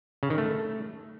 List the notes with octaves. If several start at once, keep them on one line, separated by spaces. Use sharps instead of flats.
C#3
D#3
A3